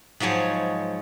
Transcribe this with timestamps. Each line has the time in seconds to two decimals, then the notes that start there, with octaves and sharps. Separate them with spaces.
0.20 G#2 F3 F#3 G#3 C#5